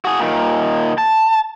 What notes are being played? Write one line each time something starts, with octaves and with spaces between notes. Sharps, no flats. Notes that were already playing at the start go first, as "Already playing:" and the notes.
F#4 G#4
A#2 D#3
A5